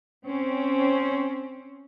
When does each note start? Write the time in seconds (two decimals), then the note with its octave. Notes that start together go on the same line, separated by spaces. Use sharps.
0.25 C4 C#4